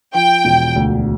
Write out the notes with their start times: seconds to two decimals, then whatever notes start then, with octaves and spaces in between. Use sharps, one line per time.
0.14 F3 G5
0.45 E1
0.76 D2